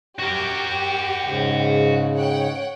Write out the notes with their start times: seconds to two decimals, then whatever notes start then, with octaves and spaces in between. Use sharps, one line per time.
0.19 F#4 G4 A#4
1.24 G#2 C#3
2.15 C#5 F#5 G5